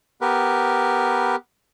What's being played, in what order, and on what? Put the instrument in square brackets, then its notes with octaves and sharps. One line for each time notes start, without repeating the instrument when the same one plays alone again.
[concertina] B3 G4 A#4 B4